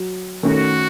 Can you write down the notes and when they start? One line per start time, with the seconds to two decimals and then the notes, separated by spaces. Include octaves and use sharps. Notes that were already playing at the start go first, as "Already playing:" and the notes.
Already playing: F#3
0.43 D#3 A3 C#4 F#4